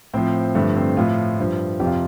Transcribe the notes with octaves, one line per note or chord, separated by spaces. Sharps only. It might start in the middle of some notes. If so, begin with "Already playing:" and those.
A2 F3 C4
G2 D3 F3 A3
C4
A2 F3 F4
G2 F3
F2 C3 F3 G4
F4